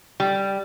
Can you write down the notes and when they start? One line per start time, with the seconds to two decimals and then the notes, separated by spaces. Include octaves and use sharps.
0.20 G3